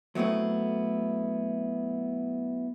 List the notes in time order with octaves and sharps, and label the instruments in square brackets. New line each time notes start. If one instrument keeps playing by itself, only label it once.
[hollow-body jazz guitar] F#3 A3 B3 C4 E4